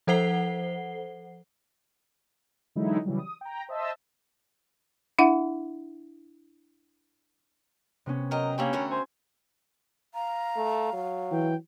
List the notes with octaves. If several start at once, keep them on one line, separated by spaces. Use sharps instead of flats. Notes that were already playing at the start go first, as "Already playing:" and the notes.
F3 A4 C5 F#5 C7 G7
D3 E3 F#3 G#3 D#4 E4
C#3 E3 F#3 G3
D#6
G5 A#5
C5 D#5 E5 A5 E6
D4 E4 E5 F#5
C3 B3 C#4
F#3 A#4 D#5 G5 F6
A#3 C#4 D4 G4 G5 B5 E6
D3 A3 F#4 A#4
C5 G#5
F5 A#5
A3
F#3
E3 G5